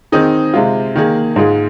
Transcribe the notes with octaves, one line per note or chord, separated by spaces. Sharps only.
D#3 C4 D#4 G#4
C3 G#3 F4
D#3 A#3 G#4
G#2 G#3 F4 G#4